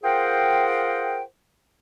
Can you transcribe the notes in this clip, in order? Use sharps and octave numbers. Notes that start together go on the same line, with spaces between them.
F4 G#4 A#4 C5 F#5 G5